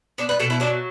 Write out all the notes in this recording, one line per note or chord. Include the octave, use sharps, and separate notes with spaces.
B3 D4
B4
B2 A4
E4
F#3 D4